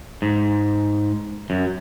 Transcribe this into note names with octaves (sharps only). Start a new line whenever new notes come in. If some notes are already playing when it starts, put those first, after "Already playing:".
G#2
F#2